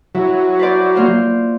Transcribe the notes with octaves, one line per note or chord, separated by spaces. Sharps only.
F#3 E4
B4 C5 D5
A#3 F4 C5